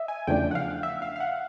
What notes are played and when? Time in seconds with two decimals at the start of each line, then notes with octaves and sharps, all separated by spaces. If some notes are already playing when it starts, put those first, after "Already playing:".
Already playing: D#5 E5
0.08 G#5
0.27 E2 C#3 F3 A3 D4 G5
0.51 F#5
0.55 F5
0.83 E5
1.02 F5
1.16 F5
1.20 F#5